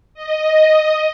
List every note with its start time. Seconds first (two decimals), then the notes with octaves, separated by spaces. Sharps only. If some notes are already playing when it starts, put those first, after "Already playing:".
0.14 D#5